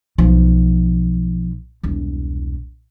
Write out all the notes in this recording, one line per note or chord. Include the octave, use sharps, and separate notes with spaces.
B1 F3
E1 C2